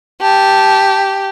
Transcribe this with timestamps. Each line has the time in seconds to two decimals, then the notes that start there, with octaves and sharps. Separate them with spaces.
0.22 G4 A5